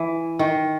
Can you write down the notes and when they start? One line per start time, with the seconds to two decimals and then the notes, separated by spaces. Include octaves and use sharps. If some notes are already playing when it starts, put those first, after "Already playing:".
Already playing: E3
0.39 D#3